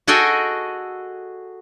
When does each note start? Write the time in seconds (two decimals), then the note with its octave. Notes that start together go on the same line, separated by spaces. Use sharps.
0.07 F#4 G#4 A4 D#5 G5 G#5